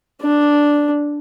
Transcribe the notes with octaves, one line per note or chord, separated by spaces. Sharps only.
D4